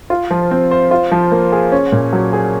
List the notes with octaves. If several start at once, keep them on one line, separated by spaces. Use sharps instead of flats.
F4
F3
C4
C5
F4
F3
A#3
G#4
C#4
A#2
F#3
G#4